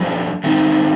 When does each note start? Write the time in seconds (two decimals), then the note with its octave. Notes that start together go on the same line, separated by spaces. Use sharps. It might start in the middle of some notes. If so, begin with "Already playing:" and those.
Already playing: F3 A3 D4 G4
0.44 D#3 A3 C4 D#4